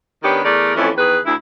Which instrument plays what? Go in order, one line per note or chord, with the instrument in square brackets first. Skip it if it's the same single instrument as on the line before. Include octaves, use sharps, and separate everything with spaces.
[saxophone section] D#3 B3 C#4 D4 G4
E2 A3 A#4 D5
F2 E3 A3 C#4
E2 D#3 G#4 B4
D2 E4